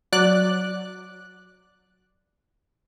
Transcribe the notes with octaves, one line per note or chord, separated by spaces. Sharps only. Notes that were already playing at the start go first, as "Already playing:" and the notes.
F#3 D5 F#6